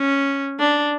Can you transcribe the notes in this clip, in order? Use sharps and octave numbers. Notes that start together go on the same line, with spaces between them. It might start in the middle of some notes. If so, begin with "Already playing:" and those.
Already playing: C#4
D4